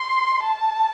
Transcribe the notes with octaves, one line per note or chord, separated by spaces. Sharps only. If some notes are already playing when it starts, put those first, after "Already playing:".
Already playing: C6
A5